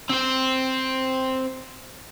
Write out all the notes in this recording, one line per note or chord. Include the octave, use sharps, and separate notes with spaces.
C4 C5